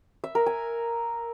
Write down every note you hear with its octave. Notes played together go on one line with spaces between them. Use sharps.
E5
A#4
G#5